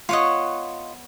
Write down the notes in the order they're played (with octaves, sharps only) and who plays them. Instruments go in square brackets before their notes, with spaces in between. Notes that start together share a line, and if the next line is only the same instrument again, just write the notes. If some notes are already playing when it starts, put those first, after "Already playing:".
[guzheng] B3 C#5 F#5 [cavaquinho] F4 D#5